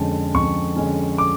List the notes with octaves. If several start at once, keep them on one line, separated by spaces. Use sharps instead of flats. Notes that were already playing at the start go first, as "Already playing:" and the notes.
Already playing: F2 D3 G#3 C#4 A5
F2 C#6
D3 G#3 C#4
D6